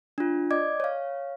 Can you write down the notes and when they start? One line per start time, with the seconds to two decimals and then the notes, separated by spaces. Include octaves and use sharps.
0.18 D4 F4
0.51 D5 D#5 D6 G#6
0.80 C#5 F5